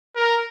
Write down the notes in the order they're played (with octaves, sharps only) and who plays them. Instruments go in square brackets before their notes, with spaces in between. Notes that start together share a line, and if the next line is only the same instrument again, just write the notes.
[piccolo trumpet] A#4